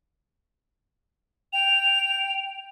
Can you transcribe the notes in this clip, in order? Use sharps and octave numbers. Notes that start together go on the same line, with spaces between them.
G5 F7